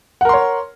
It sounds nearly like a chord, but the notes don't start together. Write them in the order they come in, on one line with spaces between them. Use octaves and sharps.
F#5 A#4 C6 C#5